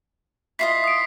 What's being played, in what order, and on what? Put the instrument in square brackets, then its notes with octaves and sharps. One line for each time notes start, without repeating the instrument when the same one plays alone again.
[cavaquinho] E4 F4 D#5 [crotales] B6 C7
[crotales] D#6 D7